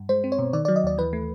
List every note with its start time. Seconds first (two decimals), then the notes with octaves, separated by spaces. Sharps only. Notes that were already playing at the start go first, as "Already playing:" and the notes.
Already playing: G2
0.09 G#3 C5
0.24 C4
0.32 C#5
0.38 B2
0.53 D#3 D5
0.65 F#3 D5
0.76 D#5
0.83 D#2 D5
0.98 E3 B4
1.13 A3